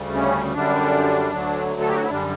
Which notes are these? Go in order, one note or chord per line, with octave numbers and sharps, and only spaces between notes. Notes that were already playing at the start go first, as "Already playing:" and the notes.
Already playing: D2 C#3 G3
C#4
F#2 D3 G3 D4
D2 D3 F#3
A4
G4
F#4
E4
F#2 D3 G3 D4